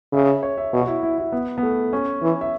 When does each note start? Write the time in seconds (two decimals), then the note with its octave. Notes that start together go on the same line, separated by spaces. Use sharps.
0.13 C#3 E5
0.43 C#5
0.58 E5
0.73 B2 C#5
0.82 F#4
0.87 E4
1.03 E4
1.18 E4
1.32 B3
1.58 B3
1.63 A3
1.93 C#4
2.23 E3
2.41 E5